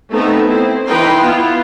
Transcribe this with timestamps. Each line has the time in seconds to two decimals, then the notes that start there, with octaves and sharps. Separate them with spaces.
0.12 A3 B3 C4 D#4 E5
0.47 C4 E4 C5
0.86 E3 D#4 B4 G5 C6
1.21 B3 E4 F4